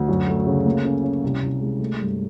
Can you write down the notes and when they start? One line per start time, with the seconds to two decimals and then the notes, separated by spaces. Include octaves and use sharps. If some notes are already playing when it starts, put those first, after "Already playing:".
Already playing: D2
0.08 F#2
0.27 A3
0.47 C#3
0.66 A#3
0.85 C#4
1.04 C#4
1.23 C2
1.42 C2
1.61 G#3
1.80 A3
1.99 G2